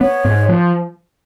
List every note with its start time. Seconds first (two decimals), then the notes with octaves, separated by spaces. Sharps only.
0.01 B3 C#5
0.25 G#2
0.49 F3